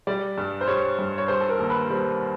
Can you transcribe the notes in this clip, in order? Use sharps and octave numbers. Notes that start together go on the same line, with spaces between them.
G3 D5
G2
C5
G3 C#5
G2
C#5
G3 C5
A4
A#4
D#2
B4
G3 C5